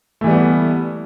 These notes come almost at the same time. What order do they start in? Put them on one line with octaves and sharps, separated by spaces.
A3 E3 G3 B3